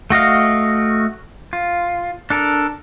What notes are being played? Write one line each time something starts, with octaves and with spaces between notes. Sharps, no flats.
A3 F#4 D#5 F5
F4
D4 A4 A#4